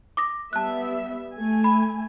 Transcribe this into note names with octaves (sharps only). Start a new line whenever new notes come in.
D6 D#6 A#6
G3 B3 E5 A5 F#6
A3 G#5
B5